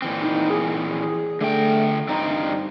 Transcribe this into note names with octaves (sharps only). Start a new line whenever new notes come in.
A#2 E3 C4
D#4
G#4
D3 A3 G5
G2 C4 D#4